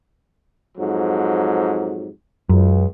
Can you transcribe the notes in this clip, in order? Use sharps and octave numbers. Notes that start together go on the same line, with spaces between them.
F2 G#2 F#3
C#2 F#2